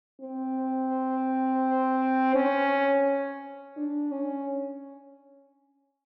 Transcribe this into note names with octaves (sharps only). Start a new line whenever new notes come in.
C4
C#4
D4
C#4